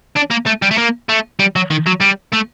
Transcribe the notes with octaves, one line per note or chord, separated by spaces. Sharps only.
D4
A#3
A3
G3
A3
A#3
A3
G3
F#3
D#3
F#3
G3
A3